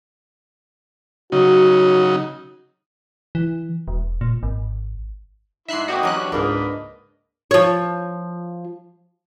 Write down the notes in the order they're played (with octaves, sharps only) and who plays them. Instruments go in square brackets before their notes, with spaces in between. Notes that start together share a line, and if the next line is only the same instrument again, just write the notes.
[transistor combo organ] C#3 F#3 D#4 [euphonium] F#4
[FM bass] E3
E1
A#2
G#1
[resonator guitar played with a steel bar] G#2 D#4 [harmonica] E4 [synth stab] E5 F#6 C7
[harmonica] A#3 C4 D#5 [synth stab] F#4 G4
[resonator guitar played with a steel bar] E3 C#4 [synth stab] F#3 F#6
[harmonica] D4 F#4 G4
[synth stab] C#2 G#2 [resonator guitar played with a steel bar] A#3 D4 [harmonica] B4 D#5
[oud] F3 C#5